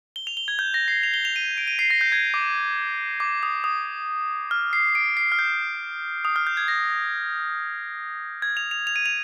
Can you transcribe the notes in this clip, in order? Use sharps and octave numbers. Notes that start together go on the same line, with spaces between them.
G7
F7
G7
G#6
G6
A#6
C7
F7
G7
F7
D#7
D7
D#7
C7
A#6
G6
G#6
D6
D6
D#6
D#6
F6
C7
D7
C7
F6
G6
D#6
F6
G6
G#6
A#6
G#6
F7
F7
F7
D#7
F7